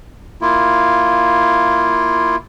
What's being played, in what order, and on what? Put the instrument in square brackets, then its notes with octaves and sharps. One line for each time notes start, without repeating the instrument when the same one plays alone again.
[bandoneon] A#3 E4 F4